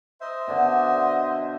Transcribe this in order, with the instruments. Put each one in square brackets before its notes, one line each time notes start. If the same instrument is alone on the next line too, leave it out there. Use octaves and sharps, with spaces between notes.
[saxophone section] C5 D#5 E5
[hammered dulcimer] B2 D3 D4